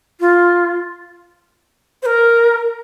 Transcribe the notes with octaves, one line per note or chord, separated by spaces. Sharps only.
F4
C5
A#4